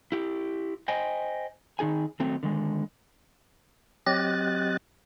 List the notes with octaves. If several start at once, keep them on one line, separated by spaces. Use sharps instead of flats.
E4 G4
C5 D#5 G5 G#5
D#3 D#4 G#4 G#5
D#3 F#3 A3 C4
D3 D#3 G#3
F#3 C4 G4 D#5 F#6 A6